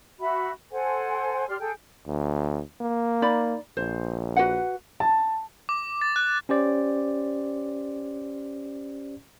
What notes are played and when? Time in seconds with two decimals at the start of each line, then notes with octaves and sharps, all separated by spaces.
0.19 F#4 E5 B5
0.72 A4 C5 F#5 G#5
1.48 G4 D5 C6 F6
1.60 G#4 A4 G5
2.07 D2
2.81 A#3
3.22 D#4 D5 B5
3.77 A#1 C5
4.36 F#4 B4 F#5
5.00 A5
5.69 D6
6.01 A6
6.16 F#6
6.49 C#4 G4 C5 D5